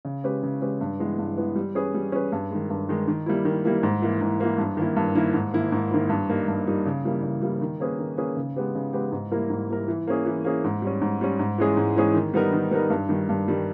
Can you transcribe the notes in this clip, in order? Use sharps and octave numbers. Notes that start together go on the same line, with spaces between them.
C#3
G#3 C#4 G4 B4
C#3
G#3 C#4 G4 B4
G2
E3 G#3 B3
G2
E3 G#3 B3
G3
C#4 G#4 B4
G3
C#4 G#4 B4
G2
D#3 G#3
G2
D#3 G#3
D#3
G3 A#3 E4
D#3
G3 A#3 E4
G#2
E3 A#3
G#2
E3 A#3
G2
D#3 A#3 E4
G2
D#3 A#3 E4
G#2
D#3 A#3 E4
G#2
D#3 A#3 E4
G2
G3 A#3 D#4
G2
G3 A#3 D#4
C#3
E3 G3 A#3
C#3
E3 G3 A#3
D#3
A#3 C#4 G#4 B4
D#3
A#3 C#4 G#4 B4
C#3
G#3 B3 G4 B4
C#3
G#3 B3 G4 B4
G#2
G3 A#3 E4 A#4
G#2
G3 A#3 E4 A#4
E3
A#3 C#4 G#4
E3
A#3 C#4 G#4
G#2
G3 C#4
G#2
G3 C#4
G#2
E3 G#3 C#4 G#4
G#2
E3 G#3 C#4 G#4
D#3
G3 B3 D#4 A#4
D#3
G3 B3 D#4 A#4
G2
D#3 G3
G2
D#3 G3